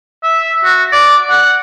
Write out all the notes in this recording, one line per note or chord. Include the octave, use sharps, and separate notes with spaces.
E5
F#4
D5
F#5